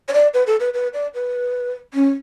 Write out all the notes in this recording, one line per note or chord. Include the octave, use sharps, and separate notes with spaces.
C#5
D5
B4
A4
B4
B4
D5
B4
C#4